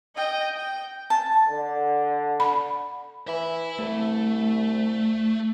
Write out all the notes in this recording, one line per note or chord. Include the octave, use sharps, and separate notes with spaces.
D#5 G5
G5
A5
D3
B5
E3 E5 B5
C2 A3